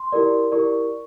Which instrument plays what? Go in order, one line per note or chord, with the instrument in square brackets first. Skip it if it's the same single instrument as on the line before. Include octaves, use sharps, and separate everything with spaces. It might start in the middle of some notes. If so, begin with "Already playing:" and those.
Already playing: [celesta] C6
E4 G4 A#4 D5
E4 G4 A#4 D5 C#6